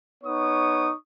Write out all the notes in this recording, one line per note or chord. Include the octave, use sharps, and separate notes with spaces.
B3 D#4 C#5 C#6 D#6